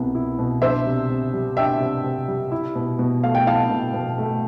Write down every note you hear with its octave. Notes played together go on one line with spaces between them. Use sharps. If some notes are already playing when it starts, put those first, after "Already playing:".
Already playing: C2 B2 B3
E4
B2
D4 C5 E5
C3
C3
G3
D4 E5 G5
C3
C3
G3
E4
B2
B2
A3 F5
G5
E4 F5 A5
B2
B2
A3